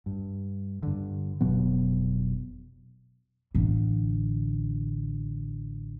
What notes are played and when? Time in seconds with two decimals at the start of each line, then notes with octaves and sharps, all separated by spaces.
0.06 G2
0.83 G2 D3
1.41 F1 B2 F#3 B3
3.55 A1 D3